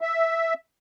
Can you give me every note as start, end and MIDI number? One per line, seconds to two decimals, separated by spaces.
0.01 0.54 76